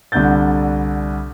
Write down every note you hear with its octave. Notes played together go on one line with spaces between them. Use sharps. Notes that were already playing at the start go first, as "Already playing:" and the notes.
C2 D3 D4 F#5 G6 A6